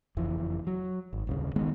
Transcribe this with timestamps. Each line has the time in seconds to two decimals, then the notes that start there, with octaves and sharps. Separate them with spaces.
0.17 F#1 F2 E3
0.67 F#3
1.13 G#1
1.27 D#1 C2 C#3
1.56 D#3 G#3 B3